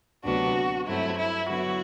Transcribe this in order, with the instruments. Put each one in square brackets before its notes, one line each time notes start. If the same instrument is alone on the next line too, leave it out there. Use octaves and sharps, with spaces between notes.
[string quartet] D2 C3 F#3 B3 D4 [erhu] F#4
[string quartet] G2 F#3 A3 C4 [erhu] E4
[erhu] E4
[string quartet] D3 F#3 B3 E4 [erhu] F#4